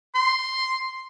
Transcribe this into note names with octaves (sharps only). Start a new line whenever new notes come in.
C6